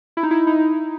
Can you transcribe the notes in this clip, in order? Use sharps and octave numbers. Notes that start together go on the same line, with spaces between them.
E4
D#4
E4
D#4